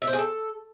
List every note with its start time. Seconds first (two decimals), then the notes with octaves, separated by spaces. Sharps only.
0.02 E5
0.07 C5
0.13 G#4
0.19 A4